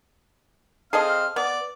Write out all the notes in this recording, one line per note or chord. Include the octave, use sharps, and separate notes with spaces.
C4 G#4 A4 D#5 F5 F6
B3 D5